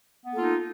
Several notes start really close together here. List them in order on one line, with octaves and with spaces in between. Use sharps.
B3 A#3 A4 F4 D#4